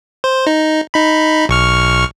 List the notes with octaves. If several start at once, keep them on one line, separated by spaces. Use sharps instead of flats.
C5
D#4
D#4 B5
B1 C#6 F6